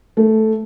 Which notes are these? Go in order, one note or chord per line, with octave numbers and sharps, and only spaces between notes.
A3